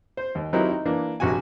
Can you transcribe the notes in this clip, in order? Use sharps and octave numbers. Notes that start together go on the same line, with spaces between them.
C5
D#2
F#3 C4 D#4 E4 G4 A#4
D#4
E3 A#3 D4
A#1 C3 F#4 F#5 G#5